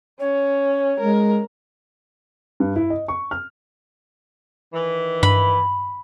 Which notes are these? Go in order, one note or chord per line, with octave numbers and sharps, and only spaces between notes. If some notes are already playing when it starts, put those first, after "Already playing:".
C#4 C#5
G#3 A#4
G2
E4
D#5
C#6
F6
D#3 E3
G2 B5